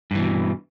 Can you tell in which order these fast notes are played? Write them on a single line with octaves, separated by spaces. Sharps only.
G2 E3 B2